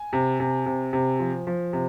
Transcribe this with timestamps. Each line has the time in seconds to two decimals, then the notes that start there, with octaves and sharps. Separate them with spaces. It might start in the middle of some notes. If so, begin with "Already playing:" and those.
Already playing: G#5
0.13 C3
0.40 C3
0.66 C3
0.93 C3
1.19 F3
1.47 F3
1.73 C3